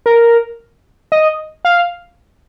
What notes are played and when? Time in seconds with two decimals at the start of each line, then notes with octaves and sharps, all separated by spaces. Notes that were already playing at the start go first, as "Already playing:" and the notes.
0.06 A#4
1.12 D#5
1.65 F5